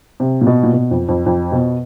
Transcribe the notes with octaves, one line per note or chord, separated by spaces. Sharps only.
C3
A#2
B2
A#2
B2
F2
F2
F2
B2